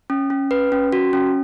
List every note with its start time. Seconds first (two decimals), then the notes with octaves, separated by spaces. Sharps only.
0.10 C#4
0.30 C#4
0.51 B4
0.72 C#4
0.92 F#4
1.13 C#4